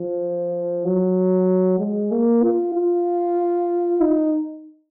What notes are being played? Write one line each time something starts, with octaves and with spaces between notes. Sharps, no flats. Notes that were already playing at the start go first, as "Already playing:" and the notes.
Already playing: F3
F#3
G#3
A#3
F4
F4
D#4